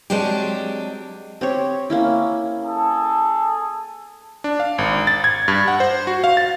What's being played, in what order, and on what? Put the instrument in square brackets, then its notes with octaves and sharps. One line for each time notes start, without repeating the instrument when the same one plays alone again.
[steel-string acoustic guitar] F#3 G#3 C4 D4 G4
[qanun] C4 G4 C#5
A#3 C#4 E4
[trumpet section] G#4 A4
[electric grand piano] D4
F5
G#1
A6
G#6
G2
F#5
C5
F#4
F5
A6